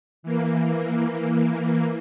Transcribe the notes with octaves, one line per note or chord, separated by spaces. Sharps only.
E3 A#3